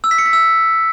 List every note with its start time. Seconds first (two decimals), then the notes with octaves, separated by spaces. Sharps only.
0.04 E6
0.11 B6
0.18 C#7
0.26 B6
0.33 E6